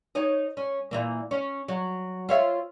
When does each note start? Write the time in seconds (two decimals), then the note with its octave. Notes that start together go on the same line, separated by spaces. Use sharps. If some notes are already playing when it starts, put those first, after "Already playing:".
0.15 D#4 C#5 D#5
0.57 C#4
0.91 A#2 E3 A#3
1.31 C#4
1.68 F#3
2.29 F4 C#5 E5